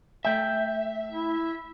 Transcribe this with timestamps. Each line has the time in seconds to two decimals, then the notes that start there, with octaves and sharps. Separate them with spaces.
0.25 A3 E5 G5
1.11 E4